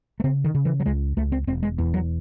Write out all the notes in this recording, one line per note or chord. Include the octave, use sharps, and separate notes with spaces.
A3
C#3 C4
D#3
C#3
E3
F#3
C#2 G#3
C#2 A3
C4
E1 C4
G#3
E2
F#3